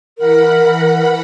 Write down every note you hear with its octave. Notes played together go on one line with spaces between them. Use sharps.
E3 A#4 F#5 B5